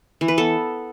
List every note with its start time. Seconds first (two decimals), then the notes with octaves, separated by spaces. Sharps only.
0.21 E3
0.28 B4
0.38 B3 A4